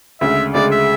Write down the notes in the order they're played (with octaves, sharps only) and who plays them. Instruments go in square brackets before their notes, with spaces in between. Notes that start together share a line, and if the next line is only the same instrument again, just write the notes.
[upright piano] D2 C#3 G#3 [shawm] E5
[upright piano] D2 C#3 G#3 [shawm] D5
[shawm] E5